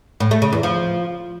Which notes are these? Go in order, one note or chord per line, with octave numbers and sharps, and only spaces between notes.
A2
A3
C#3
E2
F3